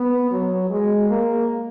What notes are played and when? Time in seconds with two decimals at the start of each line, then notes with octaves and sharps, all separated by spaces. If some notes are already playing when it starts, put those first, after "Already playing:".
Already playing: B3
0.31 F#3
0.70 G#3
1.09 A#3